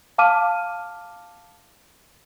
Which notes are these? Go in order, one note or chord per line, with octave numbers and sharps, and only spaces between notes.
F5 A5 D6 F6 D#7